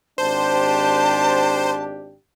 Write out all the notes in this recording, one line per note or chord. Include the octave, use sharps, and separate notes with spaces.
G#1 D4 G4 C5 A5